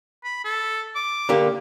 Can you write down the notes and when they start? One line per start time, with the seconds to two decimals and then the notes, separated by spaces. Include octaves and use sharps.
0.24 B5
0.45 A4
0.95 D6
1.29 D3 A#3 G4